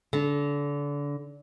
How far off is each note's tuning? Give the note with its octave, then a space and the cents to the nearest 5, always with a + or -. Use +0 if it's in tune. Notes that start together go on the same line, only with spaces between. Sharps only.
D3 -30